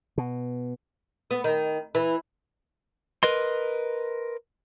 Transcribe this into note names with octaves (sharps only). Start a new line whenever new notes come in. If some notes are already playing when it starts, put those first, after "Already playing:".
B2
B3
D#3
E3
A#4 B4 D#5 C6